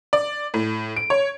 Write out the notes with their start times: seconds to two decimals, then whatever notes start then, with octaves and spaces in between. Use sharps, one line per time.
0.13 D5
0.54 A2
0.96 D7
1.10 C#5